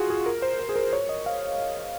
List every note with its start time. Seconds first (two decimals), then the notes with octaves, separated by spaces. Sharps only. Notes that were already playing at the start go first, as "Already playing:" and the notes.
Already playing: F4 F#4 G#4
0.10 G#4
0.26 A#4
0.42 C5
0.59 A#4
0.69 G#4
0.76 A#4
0.93 C#5
1.09 D#5
1.26 F5